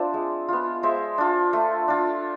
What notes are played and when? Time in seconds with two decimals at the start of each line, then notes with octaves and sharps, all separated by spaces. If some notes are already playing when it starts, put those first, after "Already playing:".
Already playing: C4 D4 F4 C5 D5 E5
0.14 G#3
0.48 B3 F4
0.83 G#3 C5 E5
1.18 D4 F4
1.53 A3
1.88 D4 F4